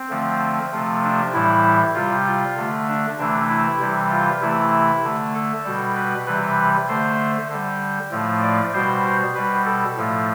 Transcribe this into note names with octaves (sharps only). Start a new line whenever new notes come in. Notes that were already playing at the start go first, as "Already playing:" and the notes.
Already playing: C4
D3 F3 A3
C3 F3 A3
D4
A2 E3 G3 E4
C3 G3 F4
F4
D3 A3
D4
C3 E3 A3 D4
E4
C3 E3 G3
F4
C3 E3 A3 E4
D3 A3
A4
B2 G3
B4
C3 E3 G3 B4
D3 A3 C5
D3 G3
A2 F3 A3
D5
B2 G3 C5
B2 G3 B4
A4
A2 F3 A3